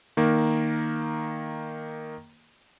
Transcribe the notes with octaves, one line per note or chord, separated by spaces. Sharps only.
D#3 A#3